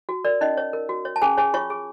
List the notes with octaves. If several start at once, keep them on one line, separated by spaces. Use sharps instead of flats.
F#4
A#4 D5
C#4 D#4 D#5
C#5
A#4
F#4
C#5
A5
C#4 G#4 G#5
G#4 C#5 G#5
F4 C#5 C#6
G#4